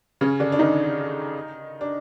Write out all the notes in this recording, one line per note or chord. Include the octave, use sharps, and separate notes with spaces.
C#3 C#4
D3 D4
D4
D#3 D#4
D4